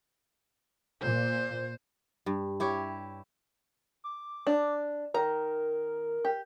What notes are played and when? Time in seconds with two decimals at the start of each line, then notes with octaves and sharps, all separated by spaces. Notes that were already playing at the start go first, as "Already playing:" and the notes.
1.02 A#2 C5
2.26 G2
2.60 E4 G4 C#5
4.04 D6
4.47 D4
5.14 D#3 A#4 A#5
6.25 G4